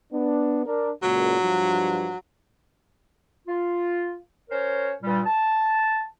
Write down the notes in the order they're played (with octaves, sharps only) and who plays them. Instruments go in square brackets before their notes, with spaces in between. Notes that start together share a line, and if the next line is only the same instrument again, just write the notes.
[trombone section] B3 D4
D4 A#4
[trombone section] C#2 A#2 [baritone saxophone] F#3
[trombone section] G2 F3
[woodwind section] F4
C#4 A#4 C5 C#5
G2 A#2 G3
A5